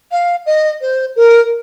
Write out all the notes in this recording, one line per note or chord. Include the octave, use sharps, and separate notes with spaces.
F5
D#5
C5
A#4